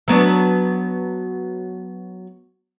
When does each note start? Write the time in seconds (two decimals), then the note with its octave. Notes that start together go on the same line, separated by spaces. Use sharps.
0.08 F#3 B3 D4